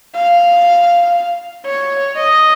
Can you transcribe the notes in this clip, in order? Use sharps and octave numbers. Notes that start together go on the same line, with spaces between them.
F5
C#5
D#5